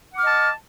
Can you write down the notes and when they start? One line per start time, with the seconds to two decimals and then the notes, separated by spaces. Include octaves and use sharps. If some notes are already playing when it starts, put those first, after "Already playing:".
0.11 F#5
0.15 D6
0.19 F6
0.22 D#5
0.26 A5